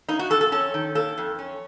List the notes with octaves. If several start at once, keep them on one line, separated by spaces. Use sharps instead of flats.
A#3 D#4
F#4
F2 A4
A4
C#4 A4
D#3
A#3 A4
F2
C#4